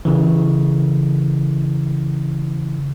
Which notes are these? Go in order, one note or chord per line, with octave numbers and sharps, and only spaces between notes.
C#3 E3